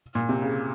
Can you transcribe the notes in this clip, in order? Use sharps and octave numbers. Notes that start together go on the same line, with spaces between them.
A#2
C3
C#3